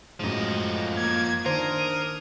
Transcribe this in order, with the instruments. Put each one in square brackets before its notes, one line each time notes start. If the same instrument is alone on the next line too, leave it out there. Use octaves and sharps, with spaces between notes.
[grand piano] F#2 A2 G#3 [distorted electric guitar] F3 D#5
[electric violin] A#3 G#6
[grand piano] D#3 [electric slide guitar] D4 C5 [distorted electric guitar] A#4 [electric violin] D#6